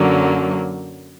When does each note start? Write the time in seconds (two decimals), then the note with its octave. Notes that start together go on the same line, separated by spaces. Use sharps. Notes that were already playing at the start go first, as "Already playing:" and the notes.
Already playing: F#2 D3 F#3 A#3